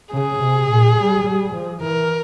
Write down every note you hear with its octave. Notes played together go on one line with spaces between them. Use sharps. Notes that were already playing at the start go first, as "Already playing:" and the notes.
C#3 G#4
C3
A#2
G3
G3
F3
E3 A#4